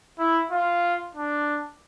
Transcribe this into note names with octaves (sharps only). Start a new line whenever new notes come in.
E4
F4
D4